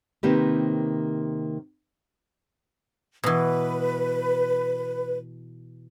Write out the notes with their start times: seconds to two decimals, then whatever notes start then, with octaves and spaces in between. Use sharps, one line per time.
0.23 C3 D#3 A#3 C4 G4 B4
3.24 B2 E3 B4